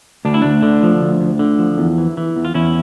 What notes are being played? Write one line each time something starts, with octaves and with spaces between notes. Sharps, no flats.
D2 D4
E4
D2 D4
D3
F3
D2
D2
D3
F3
E2
E3
E3
E2
F4
E2 C#4 E4